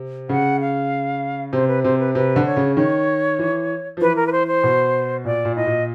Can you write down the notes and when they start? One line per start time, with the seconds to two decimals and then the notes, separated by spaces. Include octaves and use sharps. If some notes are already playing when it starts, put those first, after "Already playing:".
Already playing: C3
0.29 C#3 F#5
0.61 F5
1.53 C3 C5
1.68 B4
1.84 C3 C5
1.99 B4
2.15 C3 B4
2.36 D3
2.46 C#5
2.57 C#3
2.77 D#3 C#5
3.39 E3
3.97 F3
4.01 E3 B4
4.16 A#4
4.27 B4
4.32 C5
4.47 C5
4.63 B2
5.25 A#2 D5
5.45 A#2
5.56 A2 D#5
5.66 A#2